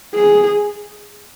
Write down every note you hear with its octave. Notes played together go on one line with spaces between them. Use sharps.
G#4